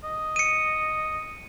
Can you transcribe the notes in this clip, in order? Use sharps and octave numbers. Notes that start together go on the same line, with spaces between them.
D#5
C#7 D#7